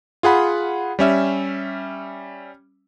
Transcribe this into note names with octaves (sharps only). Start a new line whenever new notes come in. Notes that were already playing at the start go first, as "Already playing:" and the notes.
F4 G#4 F#5 B5
G3 C#4 E5